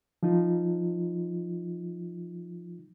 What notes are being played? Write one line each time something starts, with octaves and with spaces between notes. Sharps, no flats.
F3 D#4 F4